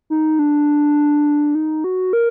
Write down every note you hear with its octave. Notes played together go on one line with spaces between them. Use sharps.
D#4
D4
D#4
F#4
A#4